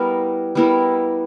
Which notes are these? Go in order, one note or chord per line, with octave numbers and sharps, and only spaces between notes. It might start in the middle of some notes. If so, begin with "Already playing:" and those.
Already playing: G3 B3 E4 A#4
G3 B3 E4 A#4